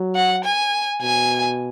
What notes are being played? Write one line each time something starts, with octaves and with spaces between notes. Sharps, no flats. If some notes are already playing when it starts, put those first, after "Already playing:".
Already playing: F#3
F#5
G#5
B2 G#5